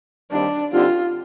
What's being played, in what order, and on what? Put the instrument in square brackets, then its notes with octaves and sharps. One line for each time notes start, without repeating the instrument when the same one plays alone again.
[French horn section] D#2 D#3 G3 C4 G4 [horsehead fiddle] D4
[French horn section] D3 G3 C4 D#4 G4 [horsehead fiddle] F4